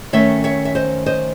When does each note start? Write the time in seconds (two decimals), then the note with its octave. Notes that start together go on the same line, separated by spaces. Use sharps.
0.13 D#3 A3 C#4 C#5 E5
0.44 C#5 E5
0.65 E5
0.75 C5 D#5
1.06 C5 D#5